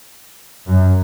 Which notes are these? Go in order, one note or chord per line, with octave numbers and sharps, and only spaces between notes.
F#2